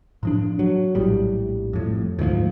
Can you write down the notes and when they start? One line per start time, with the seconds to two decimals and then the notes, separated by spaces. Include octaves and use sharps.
0.23 A2 F3 D4
0.59 F#3
0.95 A#1 A2 G3
1.73 F2 A2
2.19 D2 G#2 E3 F3